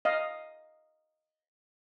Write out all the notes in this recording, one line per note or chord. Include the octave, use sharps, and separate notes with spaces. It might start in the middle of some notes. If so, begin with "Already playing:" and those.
D#5 F5